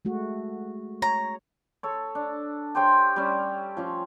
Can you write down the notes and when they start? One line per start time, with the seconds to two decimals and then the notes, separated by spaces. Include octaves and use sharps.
0.05 G#3 A3 F#4
1.02 C#5 A#5
1.83 A4 C#5
2.15 D4
2.75 G4 C5 C#5 G5
3.16 G3 C#4
3.77 F3 C#4 G4